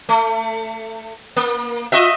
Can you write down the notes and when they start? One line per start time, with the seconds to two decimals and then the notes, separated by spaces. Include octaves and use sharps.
0.09 A3
1.36 A#3
1.92 F4 D#5 E5